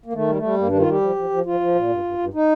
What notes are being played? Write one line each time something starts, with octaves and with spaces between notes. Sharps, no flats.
A#3
D#3 A3
G3
A3
G3
G2 A#3
D#3 D4
F4
G3 G4
F3
F3
F3
F3 F4
F3
A#2
G2
G2
G2
D#4